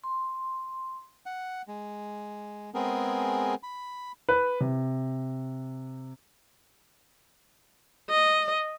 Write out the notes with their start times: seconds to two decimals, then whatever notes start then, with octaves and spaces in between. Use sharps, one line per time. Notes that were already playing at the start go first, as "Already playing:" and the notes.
0.04 C6
1.26 F#5
1.68 G#3
2.74 G#3 B3 C4 G#4 A#4
3.63 B5
4.29 B4
4.60 C3
8.10 D#5